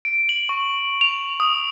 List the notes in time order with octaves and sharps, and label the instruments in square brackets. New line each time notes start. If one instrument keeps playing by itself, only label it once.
[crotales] D7
F#7
C#6
F7
D#6